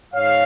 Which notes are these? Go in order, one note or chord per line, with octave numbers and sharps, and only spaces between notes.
G#2 C#5 F5